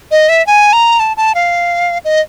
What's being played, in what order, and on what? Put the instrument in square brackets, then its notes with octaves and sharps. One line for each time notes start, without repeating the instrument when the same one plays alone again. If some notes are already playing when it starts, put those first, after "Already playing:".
[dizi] D#5
E5
G#5
A#5
A5
A5
F5
D#5